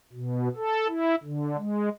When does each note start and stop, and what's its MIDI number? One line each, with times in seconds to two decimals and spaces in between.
0.13 0.49 47
0.56 0.87 69
0.88 1.15 64
1.24 1.57 50
1.57 1.89 56